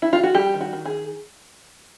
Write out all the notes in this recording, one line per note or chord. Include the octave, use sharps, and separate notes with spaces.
E4
F4
F#4
G3 G4
D#3
F#4
D#3
G#4